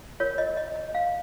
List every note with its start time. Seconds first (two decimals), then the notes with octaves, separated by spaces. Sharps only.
0.20 F4 A#4 C#5
0.38 D#5
0.57 D#5
0.76 D#5
0.95 F5